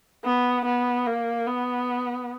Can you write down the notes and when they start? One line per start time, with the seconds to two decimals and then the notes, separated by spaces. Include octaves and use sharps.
0.25 B3
0.65 B3
1.06 A#3
1.47 B3